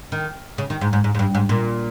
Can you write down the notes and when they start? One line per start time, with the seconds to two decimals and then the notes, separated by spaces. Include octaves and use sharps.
0.12 D#3
0.58 C#3
0.70 D#3
0.81 G#2
0.93 G#2
1.04 G#2
1.15 G#2
1.19 G2
1.35 G#2
1.49 A#2